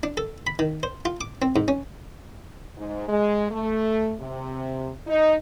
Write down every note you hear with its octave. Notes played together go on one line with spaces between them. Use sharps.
D4
A4
B5
D#3
C5
F4
D6
C4
G#2
C#4
G#2
G#3
A3
C3
D#4